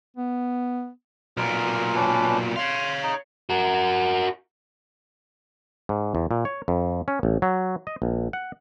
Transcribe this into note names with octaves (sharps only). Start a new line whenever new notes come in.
B3
B1 A#2 A#4
C#4 D4 B4
C#5 F5 C6
D#4
F#4 A#4
G#2
E2
A#2
C#5
F2
C#4
A1
F#3
D#5
A#1
F#5